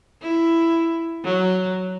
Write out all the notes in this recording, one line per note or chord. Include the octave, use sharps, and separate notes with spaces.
E4
F#3